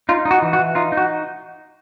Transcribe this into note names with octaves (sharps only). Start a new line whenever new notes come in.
D#4 F4
D#4
F#4
E3
F#4
E3
D#4 F4
D#4
F#4